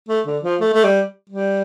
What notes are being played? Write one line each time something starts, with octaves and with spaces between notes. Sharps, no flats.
A3
D3
F3
A3
A3
G3
G3